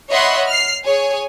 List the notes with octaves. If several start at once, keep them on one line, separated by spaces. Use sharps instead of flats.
C#5 D#5 E5 F#5 B5 C6
F6 C7
G#4 C#5 G#5